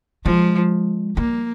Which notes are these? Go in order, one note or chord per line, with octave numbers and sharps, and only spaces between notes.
F3 G#3
G3 A#3